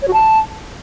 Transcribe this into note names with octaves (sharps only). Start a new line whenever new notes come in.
C#5
F#4
A5